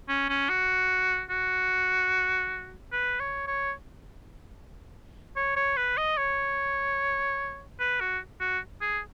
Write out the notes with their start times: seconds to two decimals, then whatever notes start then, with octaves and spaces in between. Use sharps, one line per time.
0.09 C#4
0.29 C#4
0.49 F#4
1.30 F#4
2.92 B4
3.20 C#5
3.47 C#5
5.36 C#5
5.56 C#5
5.77 B4
5.97 D#5
6.17 C#5
7.80 B4
8.00 F#4
8.40 F#4
8.81 G#4